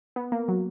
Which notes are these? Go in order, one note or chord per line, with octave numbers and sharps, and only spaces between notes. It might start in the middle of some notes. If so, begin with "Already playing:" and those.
B3
A#3
F#3